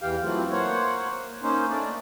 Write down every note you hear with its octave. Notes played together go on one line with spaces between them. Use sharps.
E2 E3 G4 F5 G5
E3 F#3 A3 C4 E4 F4
A#3 C5 C#5 F#5
A#3 C#4 D#4 C5
A3 C#4 D4 D5